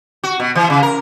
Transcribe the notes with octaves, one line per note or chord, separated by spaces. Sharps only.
F#4
B2
E3
C#3
A#4